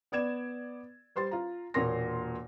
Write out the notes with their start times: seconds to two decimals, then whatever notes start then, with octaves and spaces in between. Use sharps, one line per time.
0.12 B3 D5 G#6 E7
1.16 G3 C5 C6 A6
1.31 F4 A#5
1.74 E1 A#2 A#3 C#5 C6 A#6